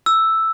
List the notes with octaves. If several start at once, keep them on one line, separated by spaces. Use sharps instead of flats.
E6